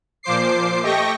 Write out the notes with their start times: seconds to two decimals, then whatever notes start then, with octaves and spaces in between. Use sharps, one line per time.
0.23 A#2 F3 C5 D6 C7
0.82 A3 G4 D#5 G5 C#6 A#6